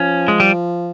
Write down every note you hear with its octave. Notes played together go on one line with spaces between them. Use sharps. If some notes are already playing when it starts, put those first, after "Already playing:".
Already playing: F3 C#4
G#3
G3